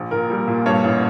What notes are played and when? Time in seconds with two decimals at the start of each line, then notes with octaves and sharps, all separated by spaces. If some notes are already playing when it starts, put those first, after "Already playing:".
Already playing: A#1
0.11 A#2 A#4
0.30 G3
0.47 A#2
0.66 G2 C#5
0.84 A1